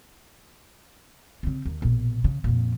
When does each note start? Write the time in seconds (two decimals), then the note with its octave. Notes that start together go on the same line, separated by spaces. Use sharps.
1.43 C#3 C4
1.65 D#2
1.82 A#1 B2
2.24 C#3
2.44 F2 A#2